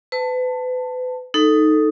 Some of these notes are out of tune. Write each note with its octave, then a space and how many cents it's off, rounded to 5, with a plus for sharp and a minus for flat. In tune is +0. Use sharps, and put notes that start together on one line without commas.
B4 +35 A5 +15
D#4 +0 A4 +0